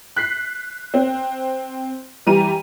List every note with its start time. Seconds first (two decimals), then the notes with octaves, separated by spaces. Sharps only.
0.16 F#6 B6 C7
0.94 C4
2.27 E3 G3 A#5 D#7